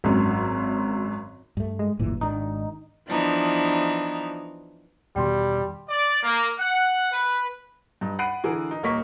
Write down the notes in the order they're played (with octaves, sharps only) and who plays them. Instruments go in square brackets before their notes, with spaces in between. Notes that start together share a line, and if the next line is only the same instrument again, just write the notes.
[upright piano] G#1 F#2
[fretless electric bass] G2 A3
[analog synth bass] G#3
[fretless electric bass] D1 A#2 E3 [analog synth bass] G1
[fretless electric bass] G#1 D#3 D4 [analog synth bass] D#4
[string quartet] E3 F3 B3 D4 D#4
[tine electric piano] E2 B2 D#3 [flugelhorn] G3 [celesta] G5 C6
[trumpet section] D5
A#3
F#5
B4
[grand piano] G2 D#4
F#5 B5 F#6 C7 D7 D#7
D3 E3 G#4 A#4
D#4
D#1 A#3 D#5 C#6 B6